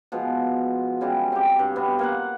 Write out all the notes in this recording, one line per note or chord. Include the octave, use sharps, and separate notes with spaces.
B2 F3 G#3
C#3 G3 G#3
C4 G4
G2
C3 B3 C5
A#3 F5 F#5